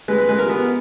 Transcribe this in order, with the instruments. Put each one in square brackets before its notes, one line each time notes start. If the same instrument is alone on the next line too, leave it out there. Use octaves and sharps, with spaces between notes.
[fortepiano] G#3 B4
B4
G#3 B4
A#4
B3